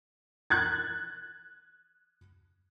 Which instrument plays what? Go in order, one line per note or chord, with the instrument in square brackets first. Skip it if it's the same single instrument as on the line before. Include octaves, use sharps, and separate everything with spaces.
[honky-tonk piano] F#6 G#6 A6